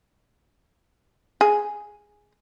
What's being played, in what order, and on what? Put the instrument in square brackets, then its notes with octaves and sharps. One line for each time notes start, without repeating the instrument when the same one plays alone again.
[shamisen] G#4